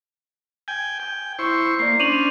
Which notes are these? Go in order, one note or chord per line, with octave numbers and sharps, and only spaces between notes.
G5 G#5
G5
E4 C5 C#6
A#3 D5 C7
C#4 D4 C5 D#7 F7 F#7